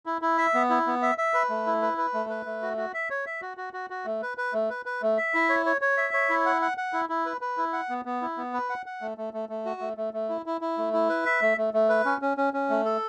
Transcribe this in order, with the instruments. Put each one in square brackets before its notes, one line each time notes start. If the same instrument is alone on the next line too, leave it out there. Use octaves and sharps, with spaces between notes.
[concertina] E4
E4
E5
B3
E4
B3
E5
E5
B4
A3
E4
B4
B4
A3
B4
A3
F#4
F#4
E5
C#5
E5
F#4
F#4
F#4
F#4
A3
B4
B4
A3
B4
B4
A3
E5
E4
C#5
C#5
C#5
E5
C#5
E4
F#5
F#5
F#5
E4
E4
B4
B4
E4
F#5
B3
B3
E4
B3
B4
F#5
F#5
A3
A3
A3
A3
F#4
A3
A3
A3
E4
E4
E4
A3
E4
B4
E5
A3
A3
A3
B4
C#4
C#4
C#4
C#4
A3
A4